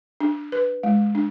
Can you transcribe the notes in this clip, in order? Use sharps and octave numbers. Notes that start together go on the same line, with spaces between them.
D4
B4
G#3
D4